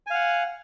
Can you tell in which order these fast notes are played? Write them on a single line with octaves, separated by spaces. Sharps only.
G#5 F5 F#5